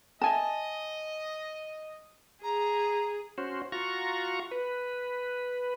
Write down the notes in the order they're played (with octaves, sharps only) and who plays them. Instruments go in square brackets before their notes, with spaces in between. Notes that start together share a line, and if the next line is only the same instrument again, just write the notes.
[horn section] D#5 [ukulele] E5 G#5 A5
[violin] G#4 [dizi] A#5
[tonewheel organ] C#4 F#4 C5
F4 F#4 A#5 C#6
B4